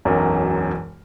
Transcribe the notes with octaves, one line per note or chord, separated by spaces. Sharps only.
E1 B1 F#2 A#4